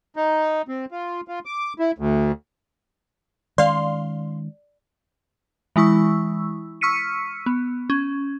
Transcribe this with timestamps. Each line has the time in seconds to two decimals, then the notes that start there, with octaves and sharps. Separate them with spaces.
0.16 D#4
0.68 C4
0.91 F4
1.28 F4
1.45 D6
1.79 E4
1.98 D2
3.58 D#3 G#3 C#4 D5 F5 C6
5.76 E3 G#3 E4 C#6 E6
6.81 C#6 E6 F6 B6 C#7 D#7
7.46 B3
7.90 C#4